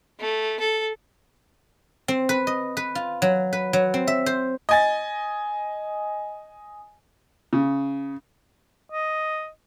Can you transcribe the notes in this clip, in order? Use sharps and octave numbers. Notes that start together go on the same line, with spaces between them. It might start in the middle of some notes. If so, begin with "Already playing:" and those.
A3
A4
C4
B4
D#5
B4
F4
F#3
B4
F#3
C4
E5
C5
D#5 G#5 A6
C#3
D#5